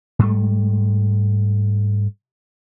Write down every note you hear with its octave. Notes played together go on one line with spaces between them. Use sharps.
G#2 G3 A3